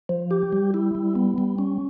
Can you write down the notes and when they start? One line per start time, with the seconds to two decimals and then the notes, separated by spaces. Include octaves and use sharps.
0.09 F3
0.31 G4
0.52 G3
0.74 E4
0.95 G3
1.15 B3
1.38 G3
1.58 C#4